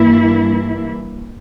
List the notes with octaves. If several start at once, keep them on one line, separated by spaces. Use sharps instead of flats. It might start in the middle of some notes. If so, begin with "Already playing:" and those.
Already playing: G2 E3 A#3 E4